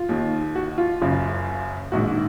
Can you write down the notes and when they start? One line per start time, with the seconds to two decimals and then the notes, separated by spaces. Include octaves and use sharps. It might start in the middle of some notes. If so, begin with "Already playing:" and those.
Already playing: F4
0.09 D#2 D#3
0.55 F#4
0.78 F4
1.01 F#1 F#2 C#3
1.92 A#1 G#2 D#3 F#4